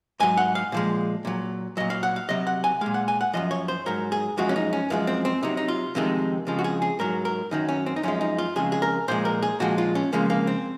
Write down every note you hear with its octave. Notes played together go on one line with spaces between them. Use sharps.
G#2 F#3 G#5
F#5
F5
A#2 F3 G#3
A#2 F#3
A#2 F#3 D#5
F5
F#5
F5
C3 F#3 D#5
F#5
G#5
A#2 G#3 F5
F#5
G#5
F#5
F#2 C#3 F3 D#5
C#5
C5
G#2 F#3 A#4
G#4
F#2 F3 G#3 F#4
C#4
D#4
C#4
F#2 F3 G#3 A#3
C4
C4
C3 F#3 D#4
D#4
F4
F2 C3 D#3 G#3
F2 C#3 F3 G#3
F#4
G#4
G#4
G#2 F#3 A#4
A#4
F#2 D#3 F#3 D#4
C#4
C4
D#4
F#2 F3 G#3 C#4
D#4
F4
F2 C#3 G#3 G#4
G#4
A#4
A#2 F3 G#3 C5
A#4
G#4
A#2 F3 G#3 F#4
F4
C#4
F2 C#3 F3 G#3 A#3
A#3
C4